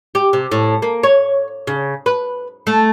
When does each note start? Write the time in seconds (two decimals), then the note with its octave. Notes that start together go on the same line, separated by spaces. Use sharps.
0.15 G4
0.33 C3
0.52 A2
0.82 A#3
1.03 C#5
1.67 C#3
2.06 B4
2.67 A3